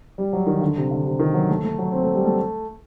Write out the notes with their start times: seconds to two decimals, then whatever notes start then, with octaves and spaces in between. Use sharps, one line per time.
0.18 G3
0.33 F#3
0.47 D#3
0.61 D3
0.76 C3
0.91 D3
1.06 C3
1.19 D#3
1.34 F#3
1.49 A3
1.64 A3
1.79 F#3
1.92 C4
2.03 A3
2.15 G3
2.26 A3